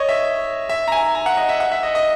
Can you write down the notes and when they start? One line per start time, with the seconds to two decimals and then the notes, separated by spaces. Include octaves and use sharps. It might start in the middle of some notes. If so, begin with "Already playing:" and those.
Already playing: C#5 D#5
0.09 E5
0.69 E5
0.88 A#5
0.92 G#5
1.15 A#5
1.26 F#5
1.37 D#5
1.49 E5
1.60 F#5
1.72 E5
1.83 D#5
1.95 D#5